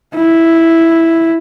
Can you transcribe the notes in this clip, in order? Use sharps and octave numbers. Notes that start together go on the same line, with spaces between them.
E4